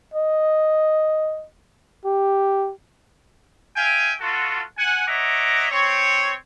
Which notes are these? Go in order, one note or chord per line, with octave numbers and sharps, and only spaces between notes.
D#5
G4
E5 F5 G5 G#5
F4 F#4 A4
F#5 G#5
C#5 D#5 E5 F#5 A#5 D6
C4 C#5